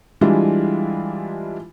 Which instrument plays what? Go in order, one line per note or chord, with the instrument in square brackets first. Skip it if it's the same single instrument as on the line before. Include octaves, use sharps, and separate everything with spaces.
[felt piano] E3 G3 G#3 D4 E4 F4